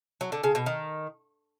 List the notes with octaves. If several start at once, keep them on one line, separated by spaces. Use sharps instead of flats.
F#3
D3
C#3
B2
D#3